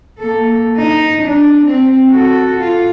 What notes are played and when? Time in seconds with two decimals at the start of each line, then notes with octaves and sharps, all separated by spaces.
0.19 A#3 A4
0.77 D#4
1.22 D4
1.66 C4
2.10 F#4 A4
2.60 F4